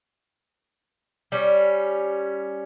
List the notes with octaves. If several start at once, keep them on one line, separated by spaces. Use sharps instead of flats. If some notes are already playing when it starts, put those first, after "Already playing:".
G3 C#4